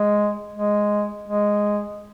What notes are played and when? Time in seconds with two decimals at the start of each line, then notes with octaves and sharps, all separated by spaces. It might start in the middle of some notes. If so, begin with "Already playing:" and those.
Already playing: G#3
0.55 G#3
1.28 G#3